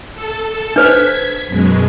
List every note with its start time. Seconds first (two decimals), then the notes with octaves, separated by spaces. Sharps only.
0.14 A4
0.76 D4 B4 C5 G#6 B6
1.48 F#2 B2 G#3